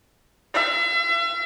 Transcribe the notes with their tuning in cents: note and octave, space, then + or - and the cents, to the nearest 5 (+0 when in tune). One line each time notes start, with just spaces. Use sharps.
E5 +40